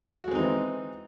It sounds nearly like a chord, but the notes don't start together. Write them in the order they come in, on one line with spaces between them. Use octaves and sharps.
F#4 G#3 C4 D#4 E3